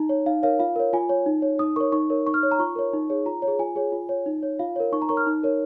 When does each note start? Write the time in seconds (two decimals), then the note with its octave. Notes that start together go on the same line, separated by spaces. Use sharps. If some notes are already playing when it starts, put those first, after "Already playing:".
Already playing: D#4 A#5
0.09 C#5
0.26 D#4 F5
0.43 A#4 C#5 F5
0.59 F4 F5
0.76 A#4 C#5
0.93 F4 G#5
1.09 C#5
1.26 D#4
1.42 C#5
1.59 D#4 D#6
1.76 A#4 C#5 C#6
1.92 D#4 C#6
2.10 A#4 C#5
2.27 D#4 C#6
2.34 F6
2.43 C#5
2.51 A#5
2.59 F4 C#6
2.76 A#4 C#5
2.93 D#4
3.10 G#4 C#5
3.26 F4 A#5
3.42 C#5
3.48 G#4
3.59 F4 G#5
3.76 G#4 C#5
3.92 F4
4.09 C#5
4.26 D#4
4.43 C#5
4.59 F4 F5
4.76 A#4 C#5
4.92 D#4 C#6
5.02 A#5
5.09 A#4 C#5 C#6
5.17 F6
5.27 D#4
5.43 A#4 C#5